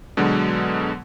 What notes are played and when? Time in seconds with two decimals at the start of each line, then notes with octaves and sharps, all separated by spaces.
0.17 B2 D3 F#3 G#3 B3